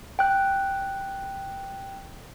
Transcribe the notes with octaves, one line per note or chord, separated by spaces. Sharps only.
G5 F#6